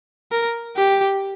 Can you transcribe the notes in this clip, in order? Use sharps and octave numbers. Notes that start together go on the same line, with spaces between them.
A#4
G4